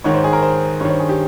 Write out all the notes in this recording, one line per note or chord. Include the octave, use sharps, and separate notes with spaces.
G#2 D#3 C#5
C5
G#4
A#4
C5
G2 D#3 C5 C#5
G#4
G4